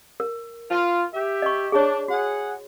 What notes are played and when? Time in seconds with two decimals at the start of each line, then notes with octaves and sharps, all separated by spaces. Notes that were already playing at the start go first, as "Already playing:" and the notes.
0.20 A#4
0.70 F4
1.11 G4 E5
1.42 D#5 C#6
1.72 D4 G#4 C#5
2.08 F#4 G#4 F#5